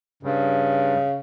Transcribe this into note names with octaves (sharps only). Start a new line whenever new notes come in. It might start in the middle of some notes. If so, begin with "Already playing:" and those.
G2 C#3